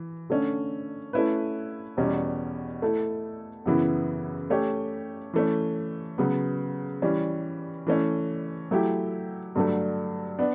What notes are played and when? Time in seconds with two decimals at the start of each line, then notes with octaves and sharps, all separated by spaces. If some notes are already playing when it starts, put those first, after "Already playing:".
Already playing: E3
0.30 D3 A3 C#4
1.13 A3 C#4 E4 B4
1.97 E2 B2 G3 C#4
2.82 A3 E4 A4
3.66 F#2 C#3 E3 B3 E4
4.50 A3 C#4 G4 C#5
5.34 E3 A3 C#4
6.18 C#3 F#3 B3
7.02 E3 G3 C#4
7.87 E3 A3 C#4
8.71 F#3 A3 E4 G4
9.55 G2 D3 F#3 A3
10.39 B3 D4